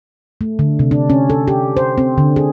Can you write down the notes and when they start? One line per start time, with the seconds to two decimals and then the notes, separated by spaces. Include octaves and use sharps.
0.41 A3
0.59 D3
0.79 C3
0.91 D4
1.10 C#4
1.30 A4
1.48 G4
1.77 C5
1.98 C4
2.18 D3
2.36 G#4